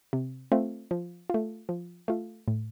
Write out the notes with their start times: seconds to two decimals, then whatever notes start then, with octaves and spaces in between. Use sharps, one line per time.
0.13 C3
0.52 A3 C4 F4
0.91 F3
1.30 A3 F4
1.69 F3
2.08 A3 F4
2.48 A2